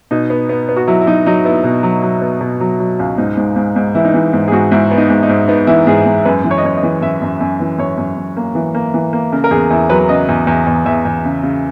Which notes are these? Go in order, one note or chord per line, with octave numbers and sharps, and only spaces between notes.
B2 D#4
B3
B3
B3
F#4
F#3 E4
E4
F#3 D#4
F#3 D#4
B3 E4
B2
F#3
F#3
B3
B2
F#3
F#3
C#2
G#2 D#4
G#2
G#2
G#2
E3 E4
D#4
E3 E4
G#2
G#4
G#2 F#4
G#2 E4
B3
D#4
G#2
D#4
G#2
B3 D#4
E3 E4
G#2 G#4
G#2
F#2 B4
E3
C#5
D#5
F#2 C#5
D#5
E3
F#2 E5
F#2
F#2
E3
F#2 C#5
F#2
F#2
A#3
E3
A#3
E3
A#3
C#3 A#4
A#4
E2 G#4
E2 E4
F#3 B4
C#3 D#5
E2
E2
E2
E2 E5
E2
C#3
C#3